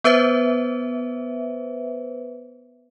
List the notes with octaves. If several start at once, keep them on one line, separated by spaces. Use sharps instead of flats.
B3 B4 C5 E5